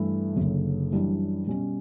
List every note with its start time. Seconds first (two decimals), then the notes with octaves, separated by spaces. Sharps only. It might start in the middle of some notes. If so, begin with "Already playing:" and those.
Already playing: G2 E3 A3 E4
0.36 F#1 F#2 D3
0.92 F#2 E3 G3 D4
1.47 B2 G3 C#4